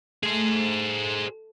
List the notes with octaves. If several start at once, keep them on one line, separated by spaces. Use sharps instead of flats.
A3 G#4 C5